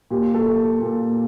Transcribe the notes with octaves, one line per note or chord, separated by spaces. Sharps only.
A#2 G4
A4
A#2